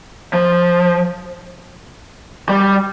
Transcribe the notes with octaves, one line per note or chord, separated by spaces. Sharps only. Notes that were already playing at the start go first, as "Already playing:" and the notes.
F3
G3